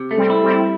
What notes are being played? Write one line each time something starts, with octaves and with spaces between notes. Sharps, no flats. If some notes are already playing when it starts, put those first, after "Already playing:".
Already playing: C3
A3
G3 C4
E4
G3 C4
E4